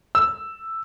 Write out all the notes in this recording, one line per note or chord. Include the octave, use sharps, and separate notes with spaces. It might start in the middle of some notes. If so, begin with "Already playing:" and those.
E6